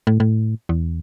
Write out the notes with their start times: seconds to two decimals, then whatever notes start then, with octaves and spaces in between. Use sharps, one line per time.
0.07 A2
0.20 A2
0.69 E2